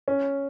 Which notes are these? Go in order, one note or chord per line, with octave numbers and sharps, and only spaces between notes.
C#4